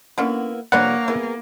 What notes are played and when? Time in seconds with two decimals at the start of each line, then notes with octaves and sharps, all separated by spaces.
0.18 D3 A#3 B3 C#4 E4
0.72 C3 F3 G3 A#3 D4 B4 C#5 F#5
1.08 B3 E4 G#4 A#4